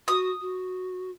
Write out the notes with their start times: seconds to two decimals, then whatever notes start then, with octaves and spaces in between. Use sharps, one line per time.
0.08 F#4 D#6
0.41 F#4